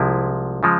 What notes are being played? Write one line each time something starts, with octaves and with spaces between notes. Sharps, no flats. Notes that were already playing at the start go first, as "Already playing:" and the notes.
Already playing: C2 C3 F3 G#3 E4
C#3 F3 G#3